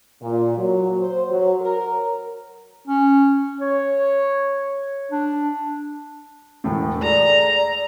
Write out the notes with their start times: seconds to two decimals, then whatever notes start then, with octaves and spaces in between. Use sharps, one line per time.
0.22 A#2
0.58 F#3
1.00 C5
1.30 F#3
1.61 A#4
2.88 C#4
3.61 C#5
5.12 D4
6.64 E1 A2
7.02 G#4 A4 D5 A#5